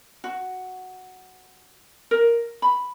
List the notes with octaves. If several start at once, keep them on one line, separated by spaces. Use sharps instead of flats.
F#4
A#4
B5